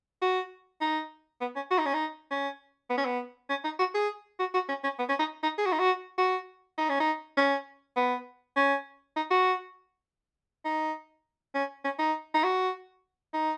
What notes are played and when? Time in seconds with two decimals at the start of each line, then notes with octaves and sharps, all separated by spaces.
0.22 F#4
0.81 D#4
1.41 B3
1.56 C#4
1.71 F#4
1.78 D#4
1.86 C#4
1.94 D#4
2.31 C#4
2.90 B3
2.98 C#4
3.05 B3
3.49 C#4
3.64 D#4
3.79 F#4
3.94 G#4
4.39 F#4
4.54 F#4
4.69 C#4
4.84 C#4
4.99 B3
5.09 C#4
5.19 D#4
5.43 D#4
5.58 G#4
5.66 F#4
5.72 D#4
5.79 F#4
6.18 F#4
6.78 D#4
6.89 C#4
7.00 D#4
7.37 C#4
7.96 B3
8.56 C#4
9.16 D#4
9.31 F#4
10.65 D#4
11.55 C#4
11.85 C#4
11.99 D#4
12.34 D#4
12.44 F#4
13.33 D#4